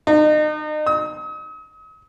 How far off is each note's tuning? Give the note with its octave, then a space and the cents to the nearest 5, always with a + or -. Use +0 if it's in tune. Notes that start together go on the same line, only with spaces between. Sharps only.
D#4 -35
D#6 +45